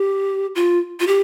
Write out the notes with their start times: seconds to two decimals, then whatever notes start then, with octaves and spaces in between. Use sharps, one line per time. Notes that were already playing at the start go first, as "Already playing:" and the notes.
Already playing: G4
0.55 F4
1.00 F4
1.07 G4